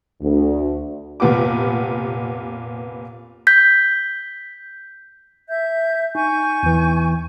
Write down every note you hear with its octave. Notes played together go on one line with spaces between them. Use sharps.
D2
F1 A#2 B3 G4 D6
G6 B6
E5 G6
D#4 G#5 C#6 G6
E2 E3